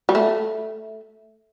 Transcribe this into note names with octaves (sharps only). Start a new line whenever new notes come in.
G3
A3